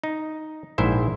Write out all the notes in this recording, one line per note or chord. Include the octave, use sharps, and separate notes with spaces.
D#4
A#1 G#2 E4 C5 E5